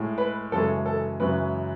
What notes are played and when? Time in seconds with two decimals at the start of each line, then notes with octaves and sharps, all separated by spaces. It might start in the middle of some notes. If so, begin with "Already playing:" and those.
Already playing: A2 G#3
0.18 B4
0.51 F#2 C#3 E3 G#3 A4
0.86 A4
1.20 F#2 C#3 E3 G#3 B4